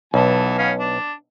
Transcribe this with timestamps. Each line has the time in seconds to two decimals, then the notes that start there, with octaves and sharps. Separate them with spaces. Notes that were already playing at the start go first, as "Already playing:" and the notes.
0.14 B1 E3 B3 A5
0.58 B3 C#4 F5
0.79 D4